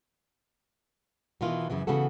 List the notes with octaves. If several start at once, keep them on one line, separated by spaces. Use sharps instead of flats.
B2 D#3 E3 F4
F#2 C#3 E3 F#3
C#3 E3 B3 F#4 A4